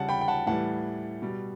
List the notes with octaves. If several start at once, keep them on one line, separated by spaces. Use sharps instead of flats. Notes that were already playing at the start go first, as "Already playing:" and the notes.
Already playing: C#3 G3 F#5 A5
G5 B5
G5
F#5 A5
A2 E3 G3 F#5 A5
B2 G3